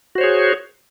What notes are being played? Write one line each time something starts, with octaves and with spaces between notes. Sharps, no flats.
F#4 G#4 C5 C#5